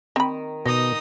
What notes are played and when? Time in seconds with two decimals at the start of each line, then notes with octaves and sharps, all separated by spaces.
0.16 D#3 C4 B5
0.65 B2 D#4 D#5 D#6